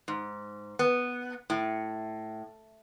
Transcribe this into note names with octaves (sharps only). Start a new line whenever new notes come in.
G#2
B3
A2